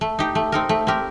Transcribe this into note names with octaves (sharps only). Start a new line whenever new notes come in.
A3
D#4 G4
A3
C4 D#4 A#4
A3
C4 G4 A#4